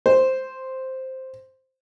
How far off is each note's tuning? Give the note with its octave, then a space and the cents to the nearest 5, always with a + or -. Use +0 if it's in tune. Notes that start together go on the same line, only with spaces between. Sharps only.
C5 +0